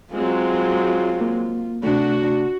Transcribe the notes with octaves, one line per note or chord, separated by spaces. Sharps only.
F#3 G#3 C4 F4
A#3
C3 A3 D4 F#4